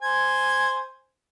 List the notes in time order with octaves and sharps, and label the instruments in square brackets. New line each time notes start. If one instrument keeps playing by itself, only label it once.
[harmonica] C5 G#5